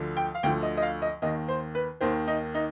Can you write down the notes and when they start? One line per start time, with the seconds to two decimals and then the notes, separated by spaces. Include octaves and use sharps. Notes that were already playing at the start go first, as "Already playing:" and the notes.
Already playing: D2 D3 F3
0.17 G5
0.35 F5
0.43 D2 D3 F3 G5
0.63 D#5
0.77 D#5
0.82 F5
1.02 D#5
1.22 D#2 D#3 D#5
1.48 C5
1.75 B4
2.01 D#2 D#3 C5
2.28 D#4
2.55 D#4